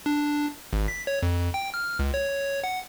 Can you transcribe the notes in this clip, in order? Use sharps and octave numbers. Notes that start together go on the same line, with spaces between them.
D4
G#1
B6
C#5
F2
G5
F6
C#2
C#5
F#5